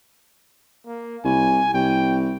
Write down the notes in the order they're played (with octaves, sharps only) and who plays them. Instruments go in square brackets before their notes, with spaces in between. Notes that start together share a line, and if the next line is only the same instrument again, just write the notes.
[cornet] A#3
[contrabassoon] C2 [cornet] G#5
[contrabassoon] C2 [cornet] G5